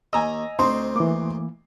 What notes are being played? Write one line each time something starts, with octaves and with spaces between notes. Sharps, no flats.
D#2 D#5 G#5 A#5 E6
D2 C4 D#4 C5 C6
E3 A#3 D6